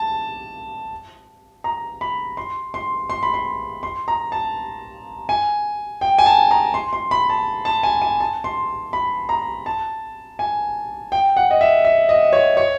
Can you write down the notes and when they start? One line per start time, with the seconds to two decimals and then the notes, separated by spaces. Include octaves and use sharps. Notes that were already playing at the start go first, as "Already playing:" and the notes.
Already playing: A5
1.64 A#5
2.01 B5
2.37 C6
2.74 C6
3.10 C6
3.23 B5
3.34 C6
3.83 C6
4.08 A#5
4.32 A5
5.29 G#5
6.01 G5
6.19 G#5
6.26 A5
6.51 A#5
6.74 C6
6.93 C6
7.11 B5
7.30 A5
7.65 A5
7.83 G#5
8.02 G#5
8.20 A5
8.44 C6
8.93 B5
9.29 A#5
9.66 A5
10.39 G#5
11.12 G5
11.37 F#5
11.51 D#5
11.61 E5
11.85 E5
12.09 D#5
12.33 C#5
12.57 C#5